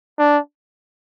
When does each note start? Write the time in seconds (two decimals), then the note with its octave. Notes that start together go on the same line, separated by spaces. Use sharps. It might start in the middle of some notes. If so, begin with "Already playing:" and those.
0.19 D4